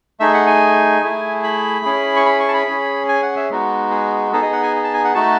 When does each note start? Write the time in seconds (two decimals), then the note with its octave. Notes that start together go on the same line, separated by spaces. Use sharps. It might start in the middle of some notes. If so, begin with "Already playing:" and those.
0.20 A3 D#4 G#4 E5
0.34 F#5
0.47 G#5
1.02 A3 E4 G#4
1.44 B5
1.85 C#4 E4 G#4
2.16 C#6
2.26 B5
2.40 C#6
2.48 A5
2.54 B5
2.67 C#4 G#4
3.09 G#5
3.23 F#5
3.36 E5
3.50 G#3 B3 D#4 F#4
3.91 G#4
4.32 B3 D#4 G#4 A4
4.42 D#5
4.53 F#5
4.63 G#5
4.84 A5
4.94 G#5
5.04 F#5
5.15 A3 D#4 F#4 A5